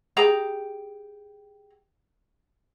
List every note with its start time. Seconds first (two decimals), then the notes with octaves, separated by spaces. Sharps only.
0.17 G4 G#4 A#5